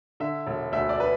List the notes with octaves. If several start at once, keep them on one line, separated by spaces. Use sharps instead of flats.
D3 E5
E1
D2 E5
D5
B4